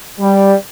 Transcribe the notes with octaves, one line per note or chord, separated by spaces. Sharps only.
G3